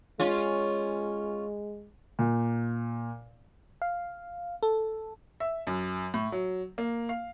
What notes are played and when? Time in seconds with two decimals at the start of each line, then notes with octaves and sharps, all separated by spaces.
0.20 G#3 C#4 F4
2.19 A#2
3.82 F5
4.63 A4
5.40 E5
5.67 F#2
6.14 A2
6.32 F#3
6.78 A#3
7.09 F5